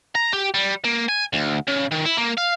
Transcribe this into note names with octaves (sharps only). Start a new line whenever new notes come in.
A#5
G4
G3
A#3
G#5
D2
C#3
D#3
E4
A#3
F5